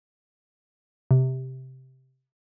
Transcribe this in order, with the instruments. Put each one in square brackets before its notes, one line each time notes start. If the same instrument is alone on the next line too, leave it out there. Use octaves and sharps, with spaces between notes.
[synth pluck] C3